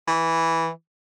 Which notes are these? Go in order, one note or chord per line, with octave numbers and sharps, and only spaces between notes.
E3